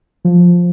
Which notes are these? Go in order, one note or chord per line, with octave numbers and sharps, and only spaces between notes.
F3